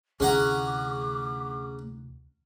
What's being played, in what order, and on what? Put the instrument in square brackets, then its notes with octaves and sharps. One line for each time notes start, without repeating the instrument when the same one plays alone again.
[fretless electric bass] D2 C3 E3 [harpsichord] C#4 F#5 A#5 [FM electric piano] G#4 [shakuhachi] D6